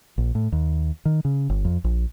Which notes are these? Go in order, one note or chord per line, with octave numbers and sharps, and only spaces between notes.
A#1
A2
D#2
D#3
C#3
G1
F2
A#1